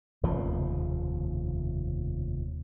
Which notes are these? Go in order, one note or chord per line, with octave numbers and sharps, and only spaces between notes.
F1 D#2 C#3 F3